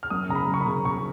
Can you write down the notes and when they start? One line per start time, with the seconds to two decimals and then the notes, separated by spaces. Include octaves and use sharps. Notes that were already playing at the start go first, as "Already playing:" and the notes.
0.03 F6
0.10 F#2 D#6
0.29 C#3 A#5
0.35 B5
0.48 F#2
0.54 C#6
0.61 B5
0.66 C#3
0.85 C#3 C#6